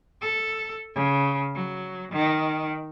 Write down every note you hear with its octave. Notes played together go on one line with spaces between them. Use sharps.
A4
C#3
F#3
D#3